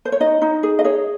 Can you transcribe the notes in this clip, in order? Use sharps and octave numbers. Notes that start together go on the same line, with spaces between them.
C5
C#5
D#4 D#5
D#4
G#4
D#5
G#4 C#5